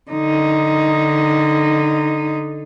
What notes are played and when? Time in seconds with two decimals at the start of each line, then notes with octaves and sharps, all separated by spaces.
0.11 D3 D#4